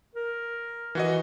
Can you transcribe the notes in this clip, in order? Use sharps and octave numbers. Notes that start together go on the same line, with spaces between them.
A#4
E3 F#4 D#5